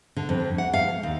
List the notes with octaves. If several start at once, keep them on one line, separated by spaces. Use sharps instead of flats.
D3
F2
F#5
F5
D#2